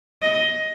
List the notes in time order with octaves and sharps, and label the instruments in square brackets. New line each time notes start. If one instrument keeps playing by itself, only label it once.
[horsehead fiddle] D#5